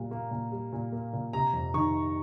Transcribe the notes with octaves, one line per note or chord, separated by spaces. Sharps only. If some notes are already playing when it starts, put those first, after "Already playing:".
Already playing: A#2 G3
A#3
A#2
G3
A#2
A#3
A#2
C3 A#5
F2
D#3 C#6